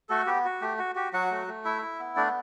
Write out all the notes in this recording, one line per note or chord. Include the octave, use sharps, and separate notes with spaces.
A3 F#4 A4
B3 G4
F#4
A3 G4
F#4
F#4 G4
F#3 F#4 F#5
A3
A3
E4 E5
E4
B3
A3 D4 D5